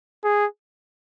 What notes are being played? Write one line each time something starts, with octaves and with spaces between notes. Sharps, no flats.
G#4